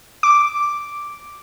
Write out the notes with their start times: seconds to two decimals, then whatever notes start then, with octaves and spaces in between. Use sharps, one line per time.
0.23 D6